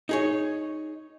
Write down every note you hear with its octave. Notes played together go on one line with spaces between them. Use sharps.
D#4 G#4 C#5